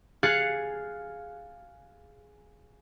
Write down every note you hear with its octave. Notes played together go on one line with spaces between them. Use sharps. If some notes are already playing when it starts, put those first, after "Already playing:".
G#4 F5 F#6 A6 C#7